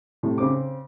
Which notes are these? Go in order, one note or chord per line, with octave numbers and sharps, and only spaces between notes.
A2 C3
C#3 C4 D6